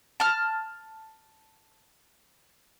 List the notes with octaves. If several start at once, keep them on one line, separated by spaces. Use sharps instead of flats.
A5 F6